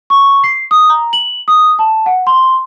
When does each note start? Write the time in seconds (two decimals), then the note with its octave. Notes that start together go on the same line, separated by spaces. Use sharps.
0.10 C#6
0.44 C7
0.71 D#6
0.90 A#5
1.13 F#7
1.48 D#6
1.79 A5
2.06 F#5
2.27 C6